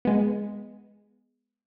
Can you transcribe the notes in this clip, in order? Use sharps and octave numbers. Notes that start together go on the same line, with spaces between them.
G#3 B3